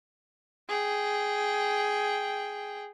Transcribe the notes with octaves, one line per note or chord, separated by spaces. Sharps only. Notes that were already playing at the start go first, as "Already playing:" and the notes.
G#4 G5